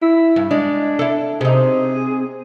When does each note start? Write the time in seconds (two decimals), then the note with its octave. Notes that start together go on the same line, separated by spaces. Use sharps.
0.02 E4
0.36 G2
0.51 G#3 D4
0.99 E4 A4
1.41 C3 D#4 G#4